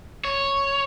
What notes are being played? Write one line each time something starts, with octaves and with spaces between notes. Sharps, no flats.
C#5